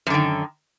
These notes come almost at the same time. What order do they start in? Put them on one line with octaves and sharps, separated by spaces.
F#2 D3 D#3